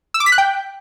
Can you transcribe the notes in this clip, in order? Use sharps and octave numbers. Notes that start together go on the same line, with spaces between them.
E6
D6
B6
F#6
G5